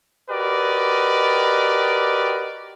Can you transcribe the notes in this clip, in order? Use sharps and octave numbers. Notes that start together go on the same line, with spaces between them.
F#4 G4 A#4 B4 D5 D#5